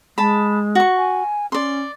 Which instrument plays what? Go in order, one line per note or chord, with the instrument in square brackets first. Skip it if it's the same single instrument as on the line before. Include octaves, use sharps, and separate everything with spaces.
[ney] G#3 [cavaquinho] A5 B5
[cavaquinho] F#4 C#6
[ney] G#5
[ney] C#4 [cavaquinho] D5 C6